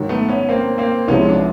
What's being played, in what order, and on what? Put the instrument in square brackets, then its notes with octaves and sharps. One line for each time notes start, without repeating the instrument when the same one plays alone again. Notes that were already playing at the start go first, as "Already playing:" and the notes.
Already playing: [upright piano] G#2 D#3 F#3
[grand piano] A3 B3
B3 C#4
A#3 C4
A#3 C4
[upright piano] C2 C3 F3 G#3 [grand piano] B3 C#4
[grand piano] D4